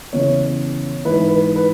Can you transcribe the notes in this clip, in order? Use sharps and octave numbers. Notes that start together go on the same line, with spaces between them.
E2 C#3 E3 C#5
G#2 E3 B4
B4
B4